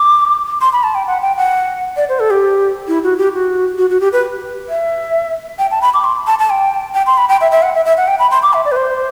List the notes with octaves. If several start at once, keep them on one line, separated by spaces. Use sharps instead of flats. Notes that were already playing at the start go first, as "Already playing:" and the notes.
Already playing: D6
C6
B5
A5
G5
F#5
G5
F#5
D5
C5
A4
G4
E4
F#4
G4
F#4
F#4
F#4
G4
B4
E5
G5
A5
B5
D6
C6
A5
A5
G5
G5
C6
B5
G5
E5
E5
F#5
E5
E5
F#5
G5
B5
C6
D6
E5
D5
B4
C5